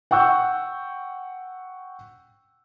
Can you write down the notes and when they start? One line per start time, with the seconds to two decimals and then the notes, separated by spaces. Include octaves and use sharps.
0.11 F#5 G5 C#6 E6 F#6 G6